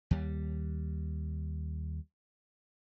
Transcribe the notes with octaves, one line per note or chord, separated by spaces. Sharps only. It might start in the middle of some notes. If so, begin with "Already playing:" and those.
D#2 G3